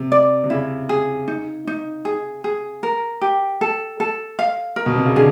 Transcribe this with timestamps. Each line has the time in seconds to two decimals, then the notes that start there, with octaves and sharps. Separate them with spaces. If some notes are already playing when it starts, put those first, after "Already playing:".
Already playing: C3
0.12 D5
0.44 C3
0.50 C#3 E4
0.89 G#4
1.28 D#4
1.67 D#4
2.05 G#4
2.44 G#4
2.83 A#4
3.21 G4
3.61 A4
4.00 A4
4.39 F5
4.76 A#4
4.86 B2
4.96 C3
5.06 C#3
5.16 D3 G#4